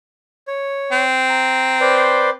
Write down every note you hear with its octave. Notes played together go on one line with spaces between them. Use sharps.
C#5
C4
A#5
B4 C5 D5